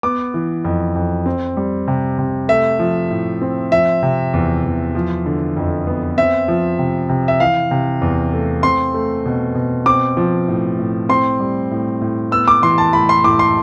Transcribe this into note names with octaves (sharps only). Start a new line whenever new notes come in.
B3 D6
E3
F2
F2
C4
G3
C3
C3
A3 E5
F3
A2
C4
F3 E5
C3
E2
E2
F3
D3
F2
B3
C4 E5
F3
C3
C3
E5
E3 F5
C3
E2
A3
C4 C6
A3
B2
B2
C4 D6
F3
A2
A2
C4 C6
G3
A2
A2
B3 E6
D6
E3 C6
A5
A2 B5
C6
A2 D6
C6